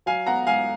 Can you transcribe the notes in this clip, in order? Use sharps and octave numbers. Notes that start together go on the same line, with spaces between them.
F#3 F5 G#5
B3 F#5 A#5
G#2 F5 G#5